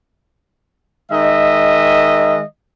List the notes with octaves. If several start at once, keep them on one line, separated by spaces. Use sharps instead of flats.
D#3 G#3 D#5 E5